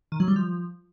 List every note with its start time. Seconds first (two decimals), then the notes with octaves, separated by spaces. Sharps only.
0.12 D#3
0.20 F#3
0.28 G3
0.36 F3